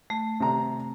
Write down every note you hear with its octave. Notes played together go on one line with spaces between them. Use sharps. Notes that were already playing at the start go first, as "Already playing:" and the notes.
A3
C3 A#5